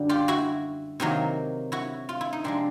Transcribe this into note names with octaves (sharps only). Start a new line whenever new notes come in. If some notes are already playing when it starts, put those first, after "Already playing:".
Already playing: F#2 D3 G3 A#3
F4 G4
E4 F#4
C3 D#3 F#3 A#3
E4 F#4
F4
E4
D#4
C3 F3 G#3 C4 D4